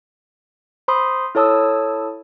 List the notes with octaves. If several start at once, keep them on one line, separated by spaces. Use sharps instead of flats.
C5 B5 C6 D#6
E4 A4 C#5 A5 D#6 E6